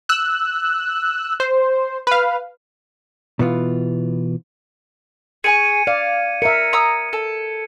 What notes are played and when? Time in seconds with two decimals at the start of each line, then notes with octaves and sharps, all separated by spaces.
0.09 E6 F#6
1.40 C5
2.07 B4 F5
3.39 B2 E3 B3 F4
5.44 G#4 G#5 C#6 G#6 C#7 D#7
5.87 D5 F5
6.42 A#4 E5 C#7
6.73 A#5 D#6 E6
7.13 A4